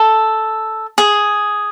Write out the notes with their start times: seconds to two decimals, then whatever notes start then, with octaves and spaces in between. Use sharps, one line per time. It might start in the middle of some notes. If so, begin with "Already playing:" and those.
Already playing: A4
0.98 G#4